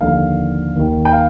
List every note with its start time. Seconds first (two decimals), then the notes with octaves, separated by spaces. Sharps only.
0.01 D#2 D3 F3 F5
0.76 D#2 D#3
1.05 G5
1.13 F5